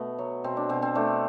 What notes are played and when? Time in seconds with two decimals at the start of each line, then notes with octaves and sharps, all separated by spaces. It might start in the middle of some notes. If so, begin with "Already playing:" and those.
Already playing: B2 A3 B3
0.18 F#3
0.44 B2 C4
0.57 D4
0.69 B2 C4
0.82 C4
0.95 A3 D4